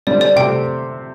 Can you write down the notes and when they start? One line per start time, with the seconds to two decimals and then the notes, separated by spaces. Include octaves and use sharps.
0.07 D3 G3 C4 D5
0.21 D5
0.36 C3 A3 C4 G4 G5